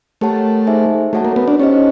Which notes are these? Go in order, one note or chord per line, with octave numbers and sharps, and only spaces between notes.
A3 G4 A#4 C#5 F#5 A5
D#4 G#4 C5 E5 G#5
A3 F#4 A4 C#5 F#5 A5
A#3
B3
D4
C#4 D#4 G4 C5 D#5